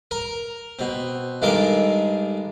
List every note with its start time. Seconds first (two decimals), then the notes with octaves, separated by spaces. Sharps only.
0.11 A#4 A#5
0.79 B2 C4
1.42 G2 D#3 G#3 A4 A#4 D6